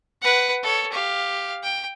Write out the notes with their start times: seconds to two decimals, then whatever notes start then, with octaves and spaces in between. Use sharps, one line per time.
0.21 B4 F#5
0.63 A4 C#5
0.92 G4 F5
1.63 G5